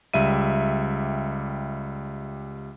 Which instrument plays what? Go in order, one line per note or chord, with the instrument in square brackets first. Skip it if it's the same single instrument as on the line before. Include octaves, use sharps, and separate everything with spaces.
[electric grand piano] C#2 G3 E5 D#7